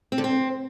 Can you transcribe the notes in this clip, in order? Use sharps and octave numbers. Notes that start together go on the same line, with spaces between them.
C4
D3
C4